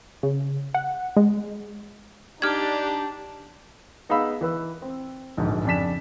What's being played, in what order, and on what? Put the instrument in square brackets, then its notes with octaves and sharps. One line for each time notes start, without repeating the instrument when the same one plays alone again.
[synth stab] C#3
F#5
G#3
[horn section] D4 [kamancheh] D#4 [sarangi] G4 [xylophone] F6 G#6
[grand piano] B3 D#4 G#4 F5 B5 E6
E3 B4 E6
C4
D1 A#1 G#2
F2 C#3 D4 G#5 B6 E7